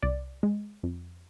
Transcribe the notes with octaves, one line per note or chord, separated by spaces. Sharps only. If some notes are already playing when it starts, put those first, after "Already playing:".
C2 D5
G#3
F2